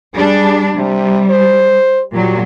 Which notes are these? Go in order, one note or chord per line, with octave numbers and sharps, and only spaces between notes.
G3 D4 G#4
C3 G3
C5
A#2 F#3 G3